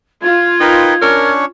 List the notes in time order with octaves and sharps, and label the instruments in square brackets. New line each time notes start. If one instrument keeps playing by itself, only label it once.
[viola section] F4 [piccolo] G#6
[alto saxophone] D#4 [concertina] A#4 B4 G5
[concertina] C#4 D4 C#5 [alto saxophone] A#4